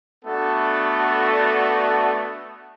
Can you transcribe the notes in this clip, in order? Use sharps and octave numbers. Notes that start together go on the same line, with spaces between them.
A3 B3 D4 F#4 A4